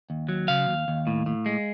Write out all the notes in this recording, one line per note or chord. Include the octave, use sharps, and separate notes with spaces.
D#2
F#3
C#3 F5
D#2
D#2
A2
A2
G#3